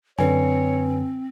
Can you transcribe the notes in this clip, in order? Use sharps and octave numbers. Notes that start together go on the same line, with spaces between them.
F#2 D3 C4 B4 C#5 G#5